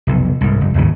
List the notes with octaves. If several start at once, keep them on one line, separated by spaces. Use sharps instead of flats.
F1 B1
C2 G#2
F#1
D1 G#1 D#2 C#3